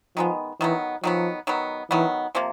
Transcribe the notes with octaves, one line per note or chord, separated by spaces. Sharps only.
D#3 F3 G#3 B3
D#3 E3 F#3 B3
D#3 F3 F#3 B3
D#3 F#3 B3
D#3 E3 F#3 B3
C3 F3 A#3